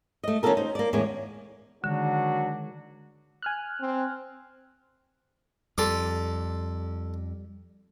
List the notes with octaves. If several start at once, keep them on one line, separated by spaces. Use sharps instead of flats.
A3 D#5
D#3 C#4 F4 F#4 A4 A#4
D#4 C5
A#3 D5
E2 A2 D#3 G#3 C#4 C#5
D3 D#3 F#3 G#3 D4 F#4
G#5 F6 F#6
C4
F2 G3 A4 C6 D6